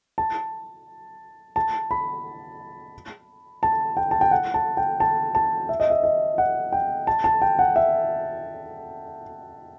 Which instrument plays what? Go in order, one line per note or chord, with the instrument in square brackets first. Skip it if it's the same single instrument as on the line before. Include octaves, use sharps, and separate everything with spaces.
[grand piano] A5
A5
B5
A5
G5
A5
G5
F#5
A5
G5
A5
A5
E5
D#5
E5
D#5
F#5
G5
A5
A5
G5
F#5
E5